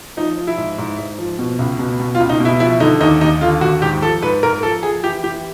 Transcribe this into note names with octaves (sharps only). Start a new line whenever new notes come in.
F3 D#4
F3
E4
G#2
G#2
G#2
F3
B2
C#2
B2
B2
F4
C#2
D#4
B2 E4
F3 E4
D3 D#4
D#2 D#4
D#2 D#4
D3 F4
D#2 F#4
G#2 G4
F3 A4
G#2 B4
G#2 A#4
F3 A4
F3 G#4
E3 G4
E3 G4